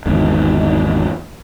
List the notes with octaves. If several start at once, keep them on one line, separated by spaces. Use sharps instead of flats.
G#1 E2 D3